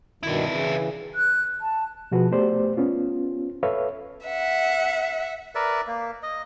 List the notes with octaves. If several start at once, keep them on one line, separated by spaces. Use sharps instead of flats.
G2 B2 D#3 D4 E4
C#3 E3
F#6
A5
B2 F3 F#4 G#4 B4
A3 B3 G4 C5 D5
B3 C#4 F4
A4 B4 C#5 E5 F5
E5 F#5
A#4 B4 D5 E5
A#3
D#5